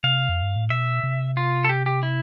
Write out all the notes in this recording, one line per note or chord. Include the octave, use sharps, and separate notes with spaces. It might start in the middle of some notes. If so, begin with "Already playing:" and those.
C3 F5
F2
G2
A2
B2 E5
C3
F4
A4
G4
G4
E4